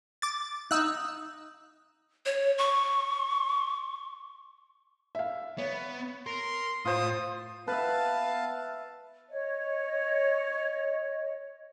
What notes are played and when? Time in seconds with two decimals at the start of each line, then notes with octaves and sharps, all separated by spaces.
0.22 D6 A6
0.71 D#4 E6 F#6
2.26 C#5
2.58 C#6
5.15 E5 F5
5.58 B3 C#5
6.27 A#4 C6
6.85 A2 F4 C5 D#6
7.68 B3 B4 E5 F5 A5
9.30 C#5 D#5